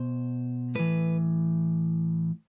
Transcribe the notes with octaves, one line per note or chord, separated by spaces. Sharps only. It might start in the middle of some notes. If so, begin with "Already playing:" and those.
Already playing: B2 C5
A2 E3 B4